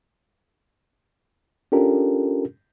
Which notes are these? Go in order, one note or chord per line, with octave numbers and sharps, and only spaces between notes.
C#4 D4 F4 G4 A4 A#4